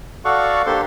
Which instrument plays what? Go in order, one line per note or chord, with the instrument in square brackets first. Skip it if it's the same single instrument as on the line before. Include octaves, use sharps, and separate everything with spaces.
[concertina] F#4 A4 D5 F5 F#5 C#6
A#3 D4 G4 A4 C5 C6